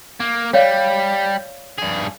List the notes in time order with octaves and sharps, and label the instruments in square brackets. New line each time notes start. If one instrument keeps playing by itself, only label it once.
[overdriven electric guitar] A#3
[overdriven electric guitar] G3 [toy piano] C#5 D5 F5
[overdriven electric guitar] G2 G#4